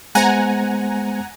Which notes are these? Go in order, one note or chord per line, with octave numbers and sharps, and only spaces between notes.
G#3 B3 C5 F#5 G#5 A#5